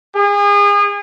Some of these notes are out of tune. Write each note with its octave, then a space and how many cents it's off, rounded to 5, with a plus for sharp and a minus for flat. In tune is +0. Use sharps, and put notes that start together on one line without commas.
G#4 -35